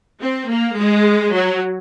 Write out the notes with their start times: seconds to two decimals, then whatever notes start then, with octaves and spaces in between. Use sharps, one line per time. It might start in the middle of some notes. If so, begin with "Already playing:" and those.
0.21 C4
0.49 A#3
0.77 G#3
1.33 F#3